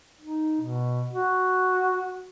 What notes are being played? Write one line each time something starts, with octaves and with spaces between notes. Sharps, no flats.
D#4
B2
F#4